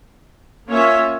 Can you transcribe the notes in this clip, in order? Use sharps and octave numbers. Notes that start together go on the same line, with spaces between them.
A#3 C#4 F4 C#5 E5